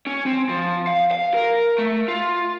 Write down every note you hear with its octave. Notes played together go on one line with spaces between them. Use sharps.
C#4
C4
F3
F5
F5
A#4
A3
F4